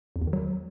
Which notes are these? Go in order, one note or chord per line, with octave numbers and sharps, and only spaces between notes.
F2
E2
D#3
F#3